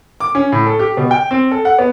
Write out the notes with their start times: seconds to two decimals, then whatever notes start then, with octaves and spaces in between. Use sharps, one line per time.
0.20 D6
0.35 C#4
0.52 A2
0.66 A4
0.79 G4
0.97 B2
1.11 G5
1.31 C4
1.51 A4
1.65 F#5
1.78 B3